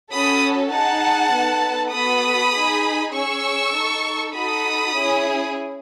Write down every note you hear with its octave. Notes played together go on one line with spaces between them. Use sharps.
C#4 F#4 A4 B5 D#6
D#4 G#4 F#5 A5
B3 D#4 A4
B3 F#4 A4 B5 D#6
D#4 G#4
C#4 G#4 C#6 E6
D#4 A4
D#4 F#4 A4 B5 D#6
C#4 E4 G#4